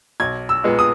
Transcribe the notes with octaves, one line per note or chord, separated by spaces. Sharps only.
B1 G#6
E6
A#2 G#3 B3
D#6